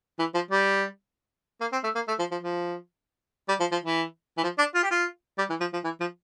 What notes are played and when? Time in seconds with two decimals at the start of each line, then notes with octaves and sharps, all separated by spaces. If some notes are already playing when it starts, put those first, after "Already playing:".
0.19 E3
0.34 F3
0.51 G3
1.61 A#3
1.72 C4
1.83 A3
1.95 A#3
2.08 A3
2.19 F3
2.31 F3
2.43 F3
3.48 G3
3.60 F3
3.72 F3
3.84 E3
4.38 E3
4.43 F3
4.58 D4
4.75 F4
4.83 G4
4.91 F4
5.38 G3
5.50 E3
5.60 F3
5.73 F3
5.84 E3
6.00 F3